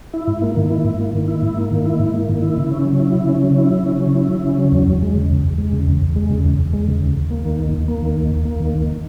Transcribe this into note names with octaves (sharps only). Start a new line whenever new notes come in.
E4
G#2
A#3
D#3
E4
G#2
A#3
D#3
E4
G#2
A#3
D#3
E4
G#2
A#3
D#3
E4
C#3
C#4
F#3
E4
C#3
C#4
F#3
E4
C#3
C#4
F#3
E4
C#3
C#4
F#3
E2
E2
G#3
C#3
E2
E2
G#3
C#3
E2
E2
G#3
C#3
E2
E2
G#3
C#3
D#2
D#2
A#3
D#3
D#2
D#2
A#3
D#3
D#2
D#2
A#3
D#3
D#2